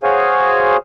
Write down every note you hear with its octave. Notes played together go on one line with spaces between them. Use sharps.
F#4 G#4 C5 C#5 F5 G#5